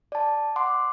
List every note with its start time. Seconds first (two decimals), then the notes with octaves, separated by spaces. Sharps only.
0.12 D5 A5
0.56 F#5 C6 D6